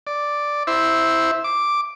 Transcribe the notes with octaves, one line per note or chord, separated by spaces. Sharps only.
D5
E4 C5 E5
D6